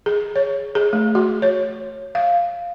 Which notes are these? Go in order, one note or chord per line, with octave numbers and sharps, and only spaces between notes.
G#4
C#5
G#4
A3
F#4
C#5
F5